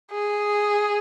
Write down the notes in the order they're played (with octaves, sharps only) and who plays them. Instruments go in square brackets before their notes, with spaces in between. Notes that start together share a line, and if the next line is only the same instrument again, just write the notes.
[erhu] G#4